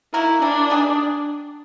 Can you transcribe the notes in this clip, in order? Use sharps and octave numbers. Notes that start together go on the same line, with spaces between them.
A#3 D#4 E4 F#4 A#4
A#3 C#4 D4 E4
G3 B3 D#4 G#4